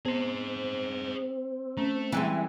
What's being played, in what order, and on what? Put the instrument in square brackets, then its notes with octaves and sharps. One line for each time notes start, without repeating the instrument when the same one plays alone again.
[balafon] B3 [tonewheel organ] C4 [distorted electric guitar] G#4 C5
[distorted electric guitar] A3 [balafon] C#4
[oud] E3 G3 G#3 [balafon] C4 [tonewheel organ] E4 E5 F#5